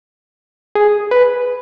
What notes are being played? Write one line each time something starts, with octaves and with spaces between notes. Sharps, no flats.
G#4
B4